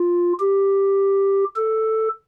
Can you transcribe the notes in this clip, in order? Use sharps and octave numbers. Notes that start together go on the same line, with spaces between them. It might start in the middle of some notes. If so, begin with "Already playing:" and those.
Already playing: F4
G4
A4